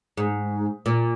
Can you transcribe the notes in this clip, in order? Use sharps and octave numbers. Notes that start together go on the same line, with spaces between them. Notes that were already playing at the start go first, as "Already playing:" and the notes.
G#2
A#2